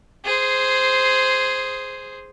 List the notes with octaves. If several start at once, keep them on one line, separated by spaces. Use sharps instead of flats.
G#4 C5